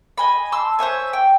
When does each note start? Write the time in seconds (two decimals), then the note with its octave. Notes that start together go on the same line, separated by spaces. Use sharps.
0.18 D#5 G#5 B5
0.52 A5 C6 E6
0.79 C5 C#5 E5 G#5
1.13 G5